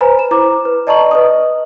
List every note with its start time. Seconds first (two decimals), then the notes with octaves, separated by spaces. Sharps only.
0.01 B4 C5 G#5 A#5 B5
0.19 E7
0.31 E4 C5 A#5 D6
0.65 B4
0.87 D5 D#5 A5 A#5 C#6 F#7
1.11 B4 D#5 D#6